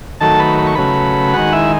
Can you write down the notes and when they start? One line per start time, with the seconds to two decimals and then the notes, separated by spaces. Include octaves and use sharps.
0.20 D#3 F#3 A3 A4 A5
0.39 B4 B5
0.58 B5
0.67 C#6
0.75 C#3 F#3 A3 B4 B5
1.34 D#3 G#3 F#4 F#5
1.52 E4 E5